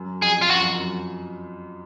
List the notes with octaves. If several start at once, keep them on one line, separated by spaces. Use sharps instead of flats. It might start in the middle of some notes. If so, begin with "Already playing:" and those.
Already playing: F#2
F2 G#4
F4
F#2 F#4
F2
F#2